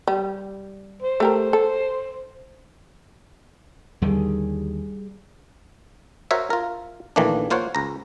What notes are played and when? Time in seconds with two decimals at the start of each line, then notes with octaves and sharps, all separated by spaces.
0.07 G3
1.02 C5
1.20 A3 G4 A#4
1.53 A4
4.02 D#2 D3 D#3 G3 G#4
6.31 F#4 A#4 C5 C#5 E5
6.50 F4 A#4
7.16 A#1 D#3 E3 A3 A#3 D4
7.50 A#3 F4 C5 C#5 F#5
7.75 C#2 A#5